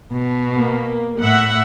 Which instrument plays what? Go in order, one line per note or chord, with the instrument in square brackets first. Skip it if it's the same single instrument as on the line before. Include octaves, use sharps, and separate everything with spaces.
[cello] B2
[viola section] A#3
[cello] A2 [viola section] E5 F#5